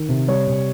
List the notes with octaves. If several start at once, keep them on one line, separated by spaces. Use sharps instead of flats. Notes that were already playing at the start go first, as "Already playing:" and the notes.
Already playing: D#3
C3
G3 C#5
C3